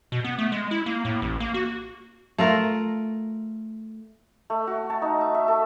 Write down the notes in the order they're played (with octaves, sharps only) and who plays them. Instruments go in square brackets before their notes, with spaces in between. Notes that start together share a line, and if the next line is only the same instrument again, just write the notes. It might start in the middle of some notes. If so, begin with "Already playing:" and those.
[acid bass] B2
B3
A3
G#3
E4
A#3
A2
A1
A#3
F#4
[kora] A3 F4 A#4
[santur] A3
F#4
A5
D#4
E5
E5
A4